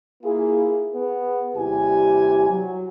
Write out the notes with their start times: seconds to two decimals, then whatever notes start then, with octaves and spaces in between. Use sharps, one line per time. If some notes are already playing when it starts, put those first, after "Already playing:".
0.23 A#3 E4 F4 G#4
0.94 B3 G#4
1.56 D#2 C3 G3 E4 G4 G#5
2.49 F#3